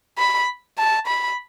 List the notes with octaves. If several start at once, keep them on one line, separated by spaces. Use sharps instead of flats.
B5
A5
B5